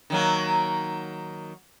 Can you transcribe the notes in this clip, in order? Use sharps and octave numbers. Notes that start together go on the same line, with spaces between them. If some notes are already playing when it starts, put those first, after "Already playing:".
D#3 F#3 A#3